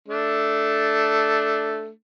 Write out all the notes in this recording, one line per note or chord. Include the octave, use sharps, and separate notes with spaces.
A3 D4